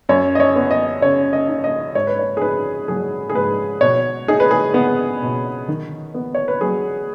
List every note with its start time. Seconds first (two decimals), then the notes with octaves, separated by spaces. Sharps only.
0.09 F#2 C#5
0.35 D#5
0.40 C#5
0.56 B3
0.71 D#5
1.02 C#3 C#5
1.33 D#5
1.48 D#4
1.64 D#5
1.95 G#2 C#5
2.07 B4
2.19 C#5
2.37 G#4
2.41 D#4 B4
2.88 F#3 G#4
3.30 G#4
3.35 G#2 B4
3.81 B2 C#5
4.28 D#4 G#4
4.40 B4
4.51 G#4
4.74 B3
5.22 B2
5.68 D#3
6.14 B3
6.35 C#5
6.48 B4
6.61 F#3 G#4